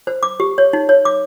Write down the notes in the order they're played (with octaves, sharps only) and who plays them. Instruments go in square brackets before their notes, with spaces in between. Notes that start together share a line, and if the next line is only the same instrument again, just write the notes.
[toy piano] C5
D6
G4
C#5
D#4
C#5
D6